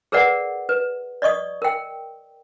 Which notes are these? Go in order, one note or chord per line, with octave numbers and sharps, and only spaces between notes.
G#4 A#4 B4 D5 F#5
B4
D5 D#5 C#6 D#6
A#4 G5